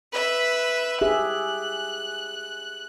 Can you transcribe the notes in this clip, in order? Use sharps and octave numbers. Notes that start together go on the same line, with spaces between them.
B4 E5
G4 G#4 E5 F#6